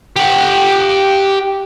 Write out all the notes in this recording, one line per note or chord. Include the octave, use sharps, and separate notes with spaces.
G4 F#5